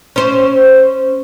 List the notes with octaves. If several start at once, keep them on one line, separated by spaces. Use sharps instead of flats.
C#4 C5